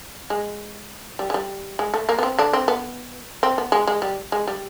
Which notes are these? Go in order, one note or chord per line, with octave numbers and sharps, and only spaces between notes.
G#3
G3
G#3
G3
G#3
A3
A#3
B3
C4
D3 D4
C4
B3
C4
B3
G#3
G#3
G3
G#3
G3